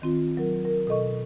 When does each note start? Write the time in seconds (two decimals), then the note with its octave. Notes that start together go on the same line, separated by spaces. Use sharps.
0.02 D#3 C4 F4
0.37 F#3 A#4
0.65 A#4
0.87 B2 A4 D#5 C#6